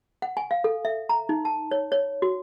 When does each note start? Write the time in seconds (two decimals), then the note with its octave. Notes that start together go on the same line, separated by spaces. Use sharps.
0.22 F#5
0.37 G#5
0.51 F5
0.64 A4
0.85 E5
1.09 A#5
1.29 D#4
1.45 A5
1.71 C#5
1.92 C#5
2.22 F#4